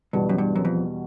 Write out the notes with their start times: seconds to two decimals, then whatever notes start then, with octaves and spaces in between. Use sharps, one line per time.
0.13 E2 G2 B2 G3
0.29 F#2
0.38 G2
0.56 F#2
0.65 F2